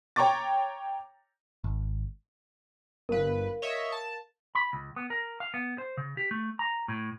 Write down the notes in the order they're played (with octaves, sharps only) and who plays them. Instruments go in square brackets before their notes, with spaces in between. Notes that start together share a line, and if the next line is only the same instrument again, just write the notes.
[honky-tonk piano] C#5 G5 A#5 C#6 D6 A6
[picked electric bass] G#1
[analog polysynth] G1 B4 [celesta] A#4 F5
[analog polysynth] C#5 D#5 E5
A5
[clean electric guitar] B5
C#2
B3
A#4
F5
B3
C5
C#3
G4
A3
A#5
A2